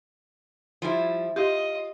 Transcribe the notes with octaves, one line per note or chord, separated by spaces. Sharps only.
F3 G3 E4
F4 G4 D#5